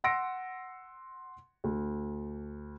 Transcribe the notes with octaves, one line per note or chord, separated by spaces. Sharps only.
F#5 C6 E6 A#6 C#7 D7
D2